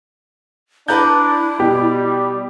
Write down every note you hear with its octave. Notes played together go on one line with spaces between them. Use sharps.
D4 E4 B4 A#5 G6
B2 G3 G4